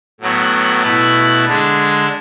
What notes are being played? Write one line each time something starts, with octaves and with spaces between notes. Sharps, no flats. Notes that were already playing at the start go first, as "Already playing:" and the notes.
A2 F#3 B3
B2 A3 E4 B4
D3 G#3 D4